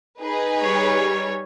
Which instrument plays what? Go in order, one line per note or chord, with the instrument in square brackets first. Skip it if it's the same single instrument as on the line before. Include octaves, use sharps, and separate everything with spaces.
[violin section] D#4 G#4 B4
[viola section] G3 C#5